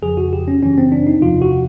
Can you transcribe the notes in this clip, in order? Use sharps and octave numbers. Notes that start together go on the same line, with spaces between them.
F2 C#3 F3 G#4
F#4
G4
C#4
F#2 C#3 E3 C#4
C4
D4
D#4
E2 C3 F3 F4
F#4